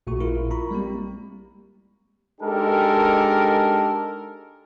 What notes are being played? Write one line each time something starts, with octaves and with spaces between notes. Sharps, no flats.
A#1 A#2 A3 F#4 C#6
A#1 E4 F4 A#4
A#5 B5 C#6
G3 G#3 A#3 C4 G4
G#3 D4 D#4 G4 A4 A#4